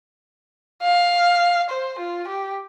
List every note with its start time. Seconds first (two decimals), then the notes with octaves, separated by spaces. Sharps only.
0.83 F5
1.69 C5
1.98 F4
2.27 G4